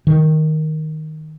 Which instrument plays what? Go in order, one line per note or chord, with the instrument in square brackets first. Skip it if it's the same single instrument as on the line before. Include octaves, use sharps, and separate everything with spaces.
[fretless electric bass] D#3